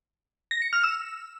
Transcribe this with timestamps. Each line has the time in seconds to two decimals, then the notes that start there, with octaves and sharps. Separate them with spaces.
0.51 A#6
0.62 C#7
0.73 F6
0.83 E6